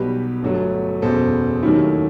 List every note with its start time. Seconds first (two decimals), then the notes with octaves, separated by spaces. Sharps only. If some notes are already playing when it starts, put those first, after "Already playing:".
Already playing: B1 B2 G3 G4 B4
0.42 G1 G2 F#3 A3
1.02 F#1 E2 B2 A4 C5
1.63 D#2 D#3 F#3 A3 E4 G4